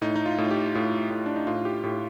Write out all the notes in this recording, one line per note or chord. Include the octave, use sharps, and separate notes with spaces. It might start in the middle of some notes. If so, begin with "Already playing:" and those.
A2 D#4
D#4
F4
A2
G4
A2 F4
A2
D4
D#4
A2 F4
G4
A2 G4